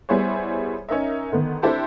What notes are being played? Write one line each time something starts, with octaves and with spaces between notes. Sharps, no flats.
G3 B3 E4 G#4 C5 C#5
C#4 D#4 A#4 E5
D3 D#3 B3
C4 D4 E4 G4 A4 C5